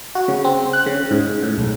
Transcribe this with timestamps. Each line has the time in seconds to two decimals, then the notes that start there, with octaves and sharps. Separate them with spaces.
0.15 F#4
0.28 C#3
0.44 C4
0.73 F#6
0.86 C#3
1.11 G#2
1.43 A2
1.58 B1